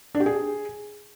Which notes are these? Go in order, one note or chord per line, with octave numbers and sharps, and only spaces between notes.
D4
G4
G#4